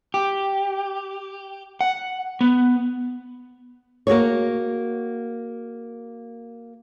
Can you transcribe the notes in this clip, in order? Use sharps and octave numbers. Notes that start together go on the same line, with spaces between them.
G4
F#5
B3
A#3 F#4 G#4 C#5